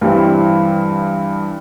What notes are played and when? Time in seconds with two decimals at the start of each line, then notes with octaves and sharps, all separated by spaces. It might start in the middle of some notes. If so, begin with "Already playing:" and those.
0.01 G2 E3 G3 C4